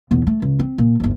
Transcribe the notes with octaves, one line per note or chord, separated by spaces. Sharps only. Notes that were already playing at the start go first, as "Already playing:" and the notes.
B1 E2
A3
C#2
C4
A#2
G1 D#2